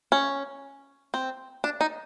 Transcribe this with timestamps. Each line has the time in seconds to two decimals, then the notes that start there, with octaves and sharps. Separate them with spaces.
0.12 C#4
1.14 C4
1.64 D4
1.81 D#4